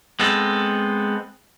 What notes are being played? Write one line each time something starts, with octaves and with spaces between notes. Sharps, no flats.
G#3 B3 C4 A4